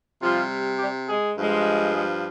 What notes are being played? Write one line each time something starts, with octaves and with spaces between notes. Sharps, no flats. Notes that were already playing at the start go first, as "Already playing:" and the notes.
C3 F3 G3 F4
G3 G4
G#3 G#4
G2 F3 G#3
G#3 G#4